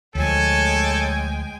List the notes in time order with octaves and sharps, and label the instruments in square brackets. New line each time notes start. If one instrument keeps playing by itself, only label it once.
[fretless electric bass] D2 F3 [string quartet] G#3 G5 G#5 [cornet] A4 [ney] C#5